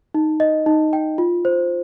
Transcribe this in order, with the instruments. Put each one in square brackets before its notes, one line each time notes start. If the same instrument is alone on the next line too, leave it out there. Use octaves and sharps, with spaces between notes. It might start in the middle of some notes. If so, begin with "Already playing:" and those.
[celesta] D#4
D#5
D#4
G5
F4
C5